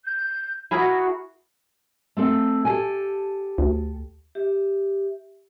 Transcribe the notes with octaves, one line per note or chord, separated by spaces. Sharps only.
G6
E4 F#4 G#4 A#4
A3 C4 A4
G4 A4 G#5
D2
G4 E5